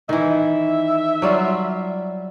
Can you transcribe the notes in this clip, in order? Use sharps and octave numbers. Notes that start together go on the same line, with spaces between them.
D#3 E3 E5
F#3 G3 F4